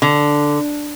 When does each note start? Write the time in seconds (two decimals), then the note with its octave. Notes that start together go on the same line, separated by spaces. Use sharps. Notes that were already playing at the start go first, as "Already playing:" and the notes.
0.02 D3